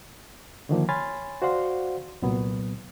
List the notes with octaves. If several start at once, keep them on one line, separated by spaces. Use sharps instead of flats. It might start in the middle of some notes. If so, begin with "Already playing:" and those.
D3 D#3 F3 A#3
C#5 G#5 B5 C6 F6 A6
F#4 C5 D5 F5 F#5 C6
C2 A#2 F#3 B3